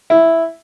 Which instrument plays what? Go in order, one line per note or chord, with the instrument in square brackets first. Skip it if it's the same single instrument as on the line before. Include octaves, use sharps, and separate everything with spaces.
[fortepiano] E4